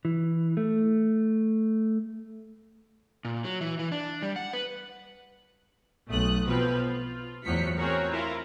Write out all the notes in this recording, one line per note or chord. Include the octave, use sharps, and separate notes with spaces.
E3
A3
A#2
F#3
E3
E3
D4
G3
F#5
B4
B1 A3 D#6 F#6
B2 F3 C4 B4
F4
E2 A2 F3 F#3 B6 C#7
C4 F#4 G#4 A#4 C#5
E4 F4 A#4